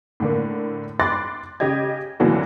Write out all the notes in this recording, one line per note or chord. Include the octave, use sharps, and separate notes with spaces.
A2 D3 A#3
B5 C6 D6 F#6 A6
C#3 G4 D#5 G#6
C2 A#2 D3 E3 F#3 A3